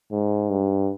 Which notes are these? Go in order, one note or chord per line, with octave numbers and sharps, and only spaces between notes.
G#2
G2